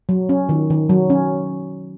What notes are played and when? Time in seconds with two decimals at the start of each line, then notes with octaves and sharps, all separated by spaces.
0.09 F#3
0.29 C#4
0.49 D#3
0.70 D#3
0.89 F#3
1.10 C#4